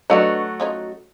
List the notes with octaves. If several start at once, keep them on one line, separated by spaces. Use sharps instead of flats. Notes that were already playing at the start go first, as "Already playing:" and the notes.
F#3 A3 D4 F#4 B4 D#5
F3 C#4 D#4